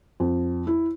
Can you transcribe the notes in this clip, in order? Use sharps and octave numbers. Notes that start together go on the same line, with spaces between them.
F2
E4